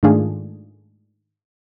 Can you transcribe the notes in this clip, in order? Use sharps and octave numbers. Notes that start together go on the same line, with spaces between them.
G#2 D#3 A3 D4 F4 G#4